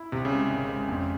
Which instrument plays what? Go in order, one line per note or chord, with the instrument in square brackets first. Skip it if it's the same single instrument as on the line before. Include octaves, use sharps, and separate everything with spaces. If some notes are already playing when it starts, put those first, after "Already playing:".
Already playing: [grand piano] E4
[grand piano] C2 [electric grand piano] C3
[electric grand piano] C#3
[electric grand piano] C3 [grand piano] G#3
[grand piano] G#1
G#3
F2